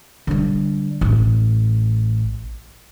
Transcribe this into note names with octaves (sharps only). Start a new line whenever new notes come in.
D3 G3
A1